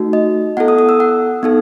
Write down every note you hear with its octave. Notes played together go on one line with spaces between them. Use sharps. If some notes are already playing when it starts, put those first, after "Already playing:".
Already playing: A3 D#4 F#4
D#5
B3 E4 A4 F#5
D#6
D#6
E6
F#5
B3 D#4 A4